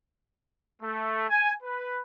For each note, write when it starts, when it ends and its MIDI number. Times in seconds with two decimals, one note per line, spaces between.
0.82 1.27 57
1.29 1.53 80
1.62 2.00 71